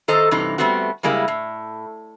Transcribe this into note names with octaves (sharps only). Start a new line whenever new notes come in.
D#3 A4 C5 D#5 A#5
G2 C3 E3 D#4
G3 A3 B3 C4 F#4
C#3 G3 G#3 A#3 E4
A2